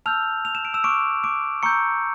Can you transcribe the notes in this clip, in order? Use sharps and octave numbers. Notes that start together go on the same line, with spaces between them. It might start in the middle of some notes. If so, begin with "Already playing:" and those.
A5 E6 F6 G6 F7
F7
E7
D7
E6 E7
C#6 D6 F6 D7
D6 D7
A#5 C#6 E6 G6 C#7